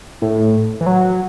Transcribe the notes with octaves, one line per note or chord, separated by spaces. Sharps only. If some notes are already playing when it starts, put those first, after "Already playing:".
A2
E3
F#3